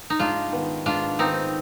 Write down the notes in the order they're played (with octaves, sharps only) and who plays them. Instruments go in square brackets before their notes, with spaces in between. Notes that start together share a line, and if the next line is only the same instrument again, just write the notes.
[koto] D#4
[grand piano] G#2 [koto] D4 F4
[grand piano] D#3 B3
[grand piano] G#2 [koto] D4 F4
[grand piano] D#3 B3 [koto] C4 D#4